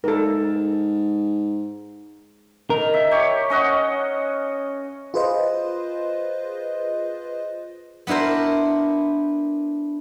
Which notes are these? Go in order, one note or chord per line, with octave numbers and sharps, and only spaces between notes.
G#2 A4 A#4
D#3 A#4
E5
G4 C#5
C#4 D#5 F#5
F4 G#4 B4 C5 D#5
B3 D4 E4 A#4 C5